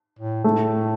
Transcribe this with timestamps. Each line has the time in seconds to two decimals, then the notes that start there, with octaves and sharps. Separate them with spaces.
0.19 A2
0.44 A2 A3